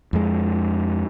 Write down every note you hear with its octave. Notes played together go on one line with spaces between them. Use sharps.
F2 G#3